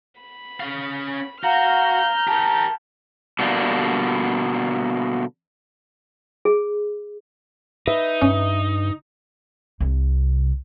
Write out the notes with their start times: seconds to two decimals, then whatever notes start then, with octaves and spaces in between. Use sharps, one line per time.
0.21 B5
0.60 C#4 F5
1.44 F#4 F5 A#5 F6 G6
2.28 G4 A#4 A5
3.39 B2 D3 G3 A#3
6.45 G#4
7.87 D#4 B4 E5
8.22 G2 C#4
9.80 C2 C3